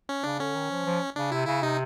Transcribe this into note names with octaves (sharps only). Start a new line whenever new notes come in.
C#4
C#3 D4
D3 C#4
D#3
F3
F3
C#3 D4
C3 E4
C#3 E4
C3 D#4